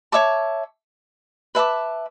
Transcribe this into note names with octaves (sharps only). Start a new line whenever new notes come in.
C#5 E5 A5 D6
B4 E5 A5 D6